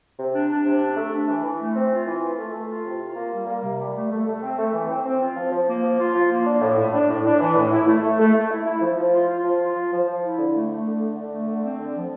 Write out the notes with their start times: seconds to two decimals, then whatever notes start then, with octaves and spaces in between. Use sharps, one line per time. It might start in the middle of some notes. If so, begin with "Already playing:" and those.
0.18 C3
0.34 D4
0.49 D4
0.66 C3
0.81 D4
0.97 A3
1.13 D4
1.28 E3
1.43 E3
1.60 A3
1.75 C4
1.91 F4
2.06 E3
2.22 F4
2.38 A3
2.53 A3
2.69 F4
2.85 C3
3.00 F4
3.16 A#3
3.32 G3
3.47 A#3
3.63 C3
3.79 G3
3.94 A3
4.10 A3
4.26 A3
4.42 C4
4.57 A3
4.73 E3
4.89 C4
5.04 C4
5.20 F4
5.36 F3
5.52 F3
5.67 A#3
5.83 F3
5.98 F4
6.14 F3
6.30 A#3
6.46 D4
6.61 A2
6.77 A2
6.92 D4
7.09 A2
7.25 D4
7.39 E3
7.55 A2
7.71 E4
7.86 A3
8.02 A3
8.19 A3
8.34 A3
8.50 E4
8.66 E4
8.81 F3
8.97 F3
9.12 F4
9.28 F4
9.44 F3
9.60 F4
9.75 F3
9.91 F3
10.07 F3
10.22 E4
10.37 D3
10.54 A3
10.69 A3
10.85 D3
11.00 D3
11.16 D3
11.32 A3
11.48 D3
11.63 C4
11.79 D3
11.95 F3